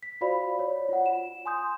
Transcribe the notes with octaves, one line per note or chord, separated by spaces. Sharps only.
B6
F4 F#4 C5 D5 F5 B5
C#5
F4 F#5
E7
G#5 C6 D#6 G6